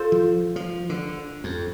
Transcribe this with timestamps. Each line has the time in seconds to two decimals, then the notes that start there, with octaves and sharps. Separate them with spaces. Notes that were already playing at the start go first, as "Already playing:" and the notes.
Already playing: F4 A4 C5
0.12 F3
0.56 F3
0.89 D3
1.44 F2